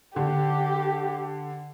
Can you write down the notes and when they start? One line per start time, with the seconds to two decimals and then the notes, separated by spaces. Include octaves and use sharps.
0.16 D3 G4